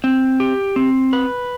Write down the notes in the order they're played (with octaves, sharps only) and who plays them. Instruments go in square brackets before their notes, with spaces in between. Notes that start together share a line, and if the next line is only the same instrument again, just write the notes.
[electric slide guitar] C4
G4
C4
B4